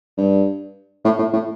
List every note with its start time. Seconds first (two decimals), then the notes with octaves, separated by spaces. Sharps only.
0.18 G2
1.04 A2
1.18 A2
1.33 A2